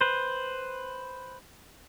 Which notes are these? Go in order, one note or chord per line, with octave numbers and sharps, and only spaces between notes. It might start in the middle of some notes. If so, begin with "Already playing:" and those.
B4 C5